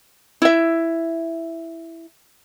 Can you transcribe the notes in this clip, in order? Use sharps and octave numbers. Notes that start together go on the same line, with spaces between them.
E4 E5